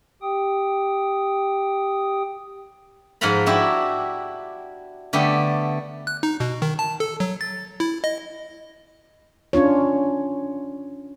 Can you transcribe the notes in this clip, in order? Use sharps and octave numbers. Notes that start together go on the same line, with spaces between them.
G4 G5 D#6
G#2 F3 F4 F#5 A#5 B5
D4 E4 F#4 G4
D3 A3 B3 G4
F#6
D#4
B2
D#3
A5
A4
F#3
A6
E4
D#5
C#4 D4 F4 C#5